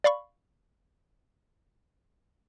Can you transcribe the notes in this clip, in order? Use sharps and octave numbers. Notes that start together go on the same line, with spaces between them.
D5 F5 B5 C#6